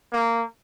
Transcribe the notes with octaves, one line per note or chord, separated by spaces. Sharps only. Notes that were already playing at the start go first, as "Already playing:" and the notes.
A#3